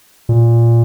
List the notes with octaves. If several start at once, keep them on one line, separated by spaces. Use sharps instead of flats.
A#2